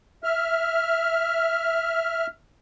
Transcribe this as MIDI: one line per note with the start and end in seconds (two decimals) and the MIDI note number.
0.24 2.27 76
0.24 2.27 89